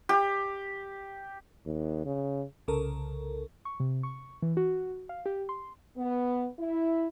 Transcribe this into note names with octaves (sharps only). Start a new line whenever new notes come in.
G4
D#2
C#3
C2 C#3 A4 A#4
C#6
C3
C#6
E3
F#4
F5
G4
C6
B3
E4